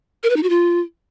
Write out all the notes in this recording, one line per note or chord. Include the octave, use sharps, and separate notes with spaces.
A#4
B4
D#4
F#4
F4